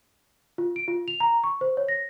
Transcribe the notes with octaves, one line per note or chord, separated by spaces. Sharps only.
F4
D7
F4
F7
A#5
C#6
C5
C#5
A#6